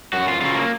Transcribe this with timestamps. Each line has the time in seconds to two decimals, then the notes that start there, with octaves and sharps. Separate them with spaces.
0.13 F#2 F#4
0.28 F4
0.41 C#3 F#3 F4
0.55 A#3